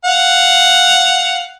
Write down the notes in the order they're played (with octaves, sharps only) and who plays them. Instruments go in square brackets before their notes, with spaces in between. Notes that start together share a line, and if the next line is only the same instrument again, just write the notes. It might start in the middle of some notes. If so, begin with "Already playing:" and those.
[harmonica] F5 F#5